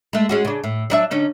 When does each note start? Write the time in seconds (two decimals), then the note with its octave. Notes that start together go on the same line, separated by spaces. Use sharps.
0.13 G#3 A3
0.29 G#3 C#4 F#4
0.45 C#3 D4
0.64 A2
0.90 F#3 D4 E5
1.11 D3 C#4 D#4